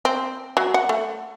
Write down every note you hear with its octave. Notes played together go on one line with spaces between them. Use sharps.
C4
F#3
F#5
A3